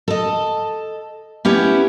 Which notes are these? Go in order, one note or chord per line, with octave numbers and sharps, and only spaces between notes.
A4 D#5
B3 C#4 E4 G4